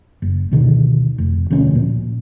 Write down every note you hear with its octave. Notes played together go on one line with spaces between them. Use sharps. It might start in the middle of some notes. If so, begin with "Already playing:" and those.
F#1
D2 B2 D#3
F1
D2 B2 F3 C#4
A#2